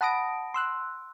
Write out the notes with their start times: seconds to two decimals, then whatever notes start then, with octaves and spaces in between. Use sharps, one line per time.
0.01 F#5 A5 B5 D#6 A#6 D7
0.54 C6 E6 F#6